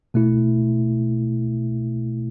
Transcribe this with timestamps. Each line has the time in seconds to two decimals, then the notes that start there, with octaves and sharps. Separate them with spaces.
0.14 B2 A3 E4